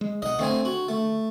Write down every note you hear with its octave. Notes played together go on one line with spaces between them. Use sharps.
G#3
B1 D#5 F#5
D3 A3 C4 G#5
F#4
A3